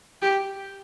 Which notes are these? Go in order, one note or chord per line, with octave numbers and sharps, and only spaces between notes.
G4